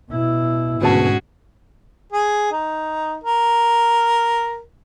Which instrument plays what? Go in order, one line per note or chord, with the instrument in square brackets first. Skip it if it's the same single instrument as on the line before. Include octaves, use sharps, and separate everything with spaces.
[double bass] B2 E4
[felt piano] D2 B2 A5 [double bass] G#2 [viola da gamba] C#4 F#4 G#4
[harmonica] G#4
D#4
A#4